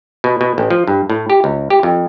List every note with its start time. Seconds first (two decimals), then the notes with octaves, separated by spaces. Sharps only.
0.24 B2
0.41 B2
0.58 A1
0.70 F3
0.88 G2
1.10 A2
1.30 G4
1.44 C#2
1.70 G4
1.83 F2